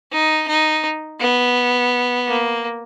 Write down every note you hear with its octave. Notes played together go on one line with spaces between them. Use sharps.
D#4
D#4
B3
A#3